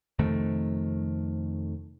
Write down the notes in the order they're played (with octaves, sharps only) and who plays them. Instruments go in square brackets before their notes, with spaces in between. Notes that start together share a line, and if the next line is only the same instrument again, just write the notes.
[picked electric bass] F2 C3 D#3 A3